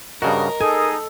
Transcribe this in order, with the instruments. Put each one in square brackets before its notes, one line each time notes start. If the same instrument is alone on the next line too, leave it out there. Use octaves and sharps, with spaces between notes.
[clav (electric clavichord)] G2 C#3 F#4 [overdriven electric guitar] A#4 [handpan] D#5
[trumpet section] D#4 G#4 D#6 [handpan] A4 [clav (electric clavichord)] G#5